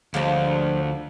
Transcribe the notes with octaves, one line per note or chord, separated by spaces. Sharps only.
D2 F3 G#3 D4